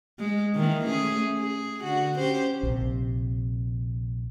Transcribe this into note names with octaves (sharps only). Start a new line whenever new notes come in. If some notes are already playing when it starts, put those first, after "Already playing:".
G#3
D#3 E3 A#3
A3 C#4 G#4
G#4
D3 F#4
C#4 G4 C5
A#1 C3